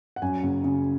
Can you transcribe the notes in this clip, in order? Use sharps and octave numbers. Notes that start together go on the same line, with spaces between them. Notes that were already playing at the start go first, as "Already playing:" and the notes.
F#5
F#2 G#5
F#1
C#3